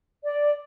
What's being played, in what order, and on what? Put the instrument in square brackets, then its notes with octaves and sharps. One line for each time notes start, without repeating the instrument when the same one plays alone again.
[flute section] D5